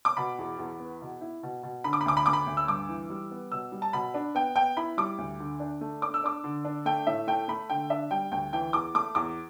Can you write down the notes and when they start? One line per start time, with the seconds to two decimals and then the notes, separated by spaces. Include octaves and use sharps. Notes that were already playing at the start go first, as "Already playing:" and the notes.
0.05 D6
0.17 B2 B5
0.39 E2
0.58 E2
0.80 B3
1.01 B2
1.21 E4
1.43 B2
1.63 B2
1.84 D3 B5
1.93 D6
2.01 B5
2.06 D2 D6
2.17 B5
2.26 D2 D6
2.33 B5
2.47 D2
2.57 E6
2.67 G2 D6
2.89 E3
3.10 G3
3.31 B3
3.52 B2 E6
3.72 G3
3.82 A5
3.93 B2 B5
4.14 D4
4.35 B3 G5
4.56 B3 G5
4.77 E4 B5
4.97 G3 D6
5.18 D2
5.40 D3
5.60 D4
5.81 A3
6.02 D4 D6
6.14 E6
6.24 D4 D6
6.44 D3
6.65 D4
6.85 A3 G5
7.07 A2 E5
7.27 A3 G5
7.48 A3 B5
7.70 D3 G5
7.90 D4 E5
8.11 G3 G5
8.31 D2 G5
8.53 E3 G5
8.73 E2 D6
8.94 A3 D6
9.15 E2 D6